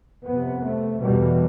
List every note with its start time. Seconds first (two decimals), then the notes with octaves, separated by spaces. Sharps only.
0.25 F2 C3 B3
0.64 A3
1.00 E2 B2 G3